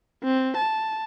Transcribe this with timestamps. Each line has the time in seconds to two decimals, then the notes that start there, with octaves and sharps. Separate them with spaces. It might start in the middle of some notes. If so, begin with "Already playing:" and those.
0.24 C4
0.57 A5